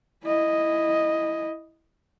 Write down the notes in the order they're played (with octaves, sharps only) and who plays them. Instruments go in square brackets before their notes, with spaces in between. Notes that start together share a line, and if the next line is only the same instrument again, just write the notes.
[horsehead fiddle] E4 D#5